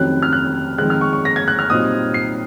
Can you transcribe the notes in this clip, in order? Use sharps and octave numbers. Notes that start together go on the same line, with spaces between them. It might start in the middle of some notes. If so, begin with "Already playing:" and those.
Already playing: F1 F2 D#3 F#3 C#4 F#6
F6
F#6
F2 D#3 G#3 F#6
F6
C#6
C#6
A#6
G#6
F#6
F6
C2 A#2 F#3 C4 D#4 D#6
C7